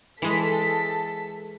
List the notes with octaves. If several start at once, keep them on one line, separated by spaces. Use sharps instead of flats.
E3 G#3 A4 B6